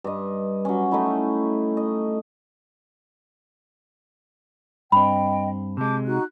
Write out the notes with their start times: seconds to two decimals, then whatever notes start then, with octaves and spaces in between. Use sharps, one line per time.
0.04 G2 D#5
0.65 F#3 C#4
0.91 A3 D#4 E4
1.77 D#5
4.92 G2 C4 D#5 G5 B5
5.77 C3 G#3 A5 D6 G6
6.05 D#4 F#4 F#6